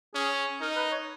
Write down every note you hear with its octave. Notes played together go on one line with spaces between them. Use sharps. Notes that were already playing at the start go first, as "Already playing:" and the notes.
C#4 G#4
D#4 A#4
B4
C#5